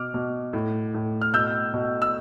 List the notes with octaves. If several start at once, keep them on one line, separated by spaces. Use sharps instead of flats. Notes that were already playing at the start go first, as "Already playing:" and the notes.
Already playing: B2 D6 F6
B2
A2
A2
F6
B2 E6 G6
B2
E6